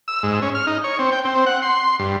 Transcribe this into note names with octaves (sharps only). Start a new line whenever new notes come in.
E6
G#2
C#4
F6
D#4
C#5
C4
G5
C4
F#5
C6
G2